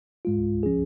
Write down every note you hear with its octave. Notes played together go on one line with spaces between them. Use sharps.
G#2 G#3 F4
F3 C#4 G#4